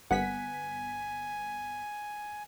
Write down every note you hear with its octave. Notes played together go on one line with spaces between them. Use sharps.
G1 B3 F#5 G#5 B6